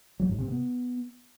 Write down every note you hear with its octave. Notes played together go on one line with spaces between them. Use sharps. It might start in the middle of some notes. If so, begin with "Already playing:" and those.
F#3
G#2
C3
B3